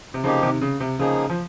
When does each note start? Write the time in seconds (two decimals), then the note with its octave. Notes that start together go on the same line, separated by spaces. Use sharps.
0.14 C3
0.23 C#3 F3 A#3 D#4 G4
0.43 C3 D#3
0.61 C#3
0.80 C3
0.99 C#3 F3 A#3 D#4 G#4
1.30 F3